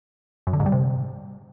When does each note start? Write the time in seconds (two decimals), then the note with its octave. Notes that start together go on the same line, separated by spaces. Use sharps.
0.47 F#2
0.53 D3
0.60 G#2
0.66 G3
0.72 C3